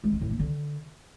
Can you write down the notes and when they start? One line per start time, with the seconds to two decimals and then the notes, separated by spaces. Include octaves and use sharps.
0.04 G#3
0.13 C#4
0.22 A2
0.30 A#3
0.39 D3